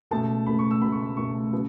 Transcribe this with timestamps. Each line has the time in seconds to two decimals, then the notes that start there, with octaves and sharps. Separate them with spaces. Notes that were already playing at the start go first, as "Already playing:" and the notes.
0.11 C#2 B2 A3 A5
0.46 C#2 B2 A3 B5
0.59 C#6
0.71 E6
0.82 C#2 B2 A3 B5
0.92 C#6
1.02 B5
1.17 C#2 B2 A3 C#6
1.52 C#3 F#3 B3